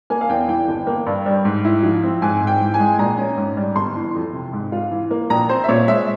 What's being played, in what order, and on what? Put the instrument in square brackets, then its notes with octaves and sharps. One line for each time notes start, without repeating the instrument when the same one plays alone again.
[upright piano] A#3 G#5
F5
E2 G5
E3 G5
G1
A#3
G2
G3
G#2
E4
F3
C4
G#2 G#5
G#2
G5
E3
G#5
G#3
A#1 A#5
C#4
G#2
G3
G1 C6
E3
F2
C3
G#2
F4
E3
A#3
A#1 A#5
C4 C5
E5
A#2 C#5
G#3 E5